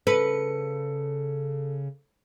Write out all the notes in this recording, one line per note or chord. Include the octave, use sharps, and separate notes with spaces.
C#3 A4 B4 C#7